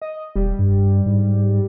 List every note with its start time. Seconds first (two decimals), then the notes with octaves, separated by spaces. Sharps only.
0.02 D#5
0.35 E1 G3
0.59 G2
1.06 G#2